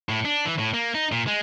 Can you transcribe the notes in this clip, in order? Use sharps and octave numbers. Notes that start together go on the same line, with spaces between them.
A2
D4
E3
A2
A#3
D#4
A#2
G#3